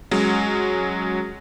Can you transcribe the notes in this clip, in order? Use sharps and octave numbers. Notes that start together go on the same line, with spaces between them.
F#3 G#3 C#4